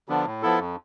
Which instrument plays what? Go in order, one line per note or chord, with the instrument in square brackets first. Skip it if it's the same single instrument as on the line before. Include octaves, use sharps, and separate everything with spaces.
[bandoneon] D3 F3 B3 D4
A2
F3 B3 E4 A4
F2